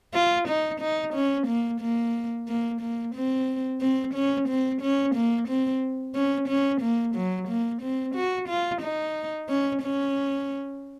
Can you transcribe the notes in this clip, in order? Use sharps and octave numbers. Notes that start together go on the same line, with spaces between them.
F4
D#4
D#4
C#4
A#3
A#3
A#3
A#3
C4
C4
C#4
C4
C#4
A#3
C4
C#4
C#4
A#3
F#3
A#3
C4
F#4
F4
D#4
C#4
C#4